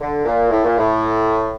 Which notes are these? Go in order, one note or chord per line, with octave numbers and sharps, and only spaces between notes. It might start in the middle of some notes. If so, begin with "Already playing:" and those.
D3
A#2
A2
A#2
A2